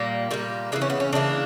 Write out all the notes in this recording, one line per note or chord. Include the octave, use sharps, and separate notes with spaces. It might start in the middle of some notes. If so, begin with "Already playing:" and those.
Already playing: A#2 G3 A#3
A#2 G3 A#3
C#3 E3 A#3 D4
C#4
B3
C#4
C#3 E3 A#3 D4